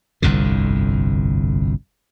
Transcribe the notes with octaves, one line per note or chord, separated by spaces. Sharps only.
G1 C2 F2 D3